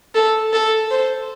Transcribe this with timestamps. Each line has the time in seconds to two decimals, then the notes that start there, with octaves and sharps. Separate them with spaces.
0.15 A4
0.53 A4
0.91 C5